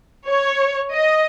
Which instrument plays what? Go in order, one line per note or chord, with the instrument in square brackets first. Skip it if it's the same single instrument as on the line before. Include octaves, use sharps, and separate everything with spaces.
[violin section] C#5
D#5